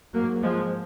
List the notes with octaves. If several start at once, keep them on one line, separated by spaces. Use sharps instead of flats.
G#2 F#3 A#3
F3 G#3